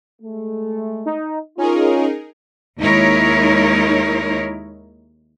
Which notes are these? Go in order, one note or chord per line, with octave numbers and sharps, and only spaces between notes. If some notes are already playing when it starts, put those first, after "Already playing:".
G#3 A3
D#4
C#4 D#4 F4 G#4 A#4
D#2 G#3 D#4 E4 A#4 C#5